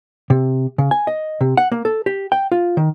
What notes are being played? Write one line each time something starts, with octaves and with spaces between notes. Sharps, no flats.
C3
C#3
G#5
D#5
C3
F#5
A#3
A4
G4
G5
F4
D#3